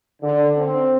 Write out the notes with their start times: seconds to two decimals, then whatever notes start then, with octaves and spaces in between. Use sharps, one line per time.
0.22 D3
0.58 C4